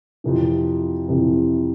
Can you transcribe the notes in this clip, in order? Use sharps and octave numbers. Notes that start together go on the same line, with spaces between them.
F2 C3 E3
F2 C3 E3